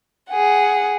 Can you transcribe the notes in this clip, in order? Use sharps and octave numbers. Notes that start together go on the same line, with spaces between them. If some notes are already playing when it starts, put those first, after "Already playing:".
G#4 F#5